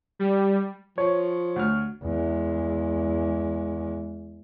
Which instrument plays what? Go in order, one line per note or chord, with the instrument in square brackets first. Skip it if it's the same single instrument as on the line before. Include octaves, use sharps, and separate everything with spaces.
[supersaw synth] G3
[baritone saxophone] F3 [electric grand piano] C#5
[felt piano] D2 F6
[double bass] E2 G#3